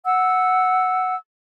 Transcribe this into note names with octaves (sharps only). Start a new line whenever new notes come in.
F#5 E6